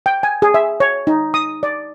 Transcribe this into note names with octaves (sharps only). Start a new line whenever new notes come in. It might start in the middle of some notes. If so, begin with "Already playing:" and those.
G5
G#5
G#4
E5
C#5
D#4
D#6
D5